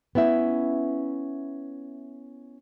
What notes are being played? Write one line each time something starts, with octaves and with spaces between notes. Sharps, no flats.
B3 C#4 E4 E5